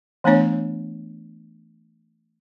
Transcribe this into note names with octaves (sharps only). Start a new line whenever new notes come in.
E3 A3 B3 D4 C#5